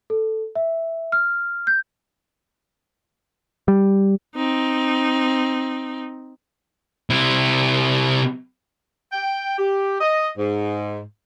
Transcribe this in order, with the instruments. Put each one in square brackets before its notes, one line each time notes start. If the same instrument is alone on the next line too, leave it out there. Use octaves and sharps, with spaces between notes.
[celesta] A4
E5
F6
G6
[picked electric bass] G3
[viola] C4 D#4
[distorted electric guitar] C3 E4
[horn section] G5
G4
D#5
G#2